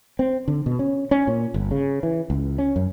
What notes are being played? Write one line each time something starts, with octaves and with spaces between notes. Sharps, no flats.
C4
D3
B2
C#4
C#4
A#2
G1
C#3
E3
C#2
C#4
F#2